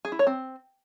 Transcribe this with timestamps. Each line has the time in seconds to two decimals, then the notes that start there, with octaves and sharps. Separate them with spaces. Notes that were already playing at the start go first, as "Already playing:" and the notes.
0.05 G#4
0.12 E4
0.19 C#5
0.27 C4